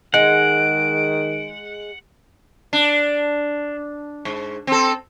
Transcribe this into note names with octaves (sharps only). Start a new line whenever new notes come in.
D#3 G#3 F#5 D7
D4
G#2
C4 A4